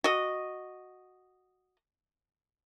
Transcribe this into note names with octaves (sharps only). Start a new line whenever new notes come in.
F#4 D#5